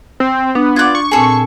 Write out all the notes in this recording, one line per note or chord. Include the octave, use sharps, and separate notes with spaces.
C4
B3 D4
F4 D5 D6 F#6 G#6
C#6
A#2 C4 G#4 A4 G#5